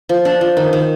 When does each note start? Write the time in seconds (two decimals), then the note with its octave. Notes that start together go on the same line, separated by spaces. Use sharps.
0.09 F3
0.25 D4
0.41 F3
0.57 D#3
0.73 D#3